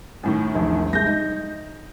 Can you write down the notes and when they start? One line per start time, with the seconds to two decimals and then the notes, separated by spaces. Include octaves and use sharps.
0.23 F#2 A2 D#3
0.55 E1 A#1
0.93 C2 G#3 G6 A#6
1.06 D#4